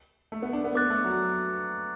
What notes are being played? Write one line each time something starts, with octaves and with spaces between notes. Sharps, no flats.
A3
B3
D4
B3
B3 D6 F#6 A6
A3
F#3